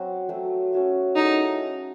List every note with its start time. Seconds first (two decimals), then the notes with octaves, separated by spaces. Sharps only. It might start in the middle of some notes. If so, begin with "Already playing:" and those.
Already playing: F#3 C4 F#4 C5
0.29 F#3 A3 C4
0.72 C#4 F#4 C#5 E5
1.16 G#3 C#4 D#4 E4 A4